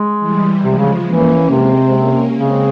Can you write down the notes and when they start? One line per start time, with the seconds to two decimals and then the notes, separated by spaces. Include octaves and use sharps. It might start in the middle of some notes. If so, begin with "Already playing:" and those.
Already playing: G#3
0.20 E3 G3
0.63 C3 F3 G#3
0.78 C#3
1.06 E3 A#3 C#4
1.49 C3 G#3 C4
1.93 A#3 C#4
2.36 C#3 G#3 C4